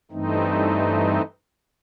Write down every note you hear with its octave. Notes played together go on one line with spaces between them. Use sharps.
G2 E3 A3 C4 D#4